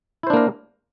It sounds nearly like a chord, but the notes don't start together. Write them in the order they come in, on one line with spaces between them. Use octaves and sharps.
E4 C5 D4 A#3 A#4